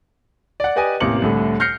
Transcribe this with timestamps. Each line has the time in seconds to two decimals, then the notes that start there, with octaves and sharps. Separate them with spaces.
0.60 D5 F#5
0.76 G4 B4 D5 D#5 G#5
1.00 A1 C3 A#3 D6 C#7 F#7
1.22 C2 A2 D3
1.60 F6 G6 A#6 C7 C#7